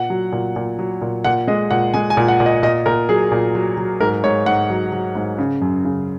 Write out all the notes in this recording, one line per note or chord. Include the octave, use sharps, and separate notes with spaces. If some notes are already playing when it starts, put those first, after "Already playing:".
Already playing: A#2 F#5
F#3
A#2
A#2
F#3
A#2
A#2 F#5
G#3 D#5
A#2 F#5
G#3 G#5
G#5
A#2
F#5
A#2
D#5
A#2 D#5
A#2 A#4
F#3 G#4
A#2
F#3
F#3
G#2 A#4
G#2 C#5
G#2 F#5
F#3
F#3
G#2
C#3
F#2
C#3